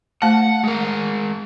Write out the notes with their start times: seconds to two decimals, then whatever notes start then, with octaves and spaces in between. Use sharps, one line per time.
0.22 A3 F#5 A5
0.63 G#3 A#4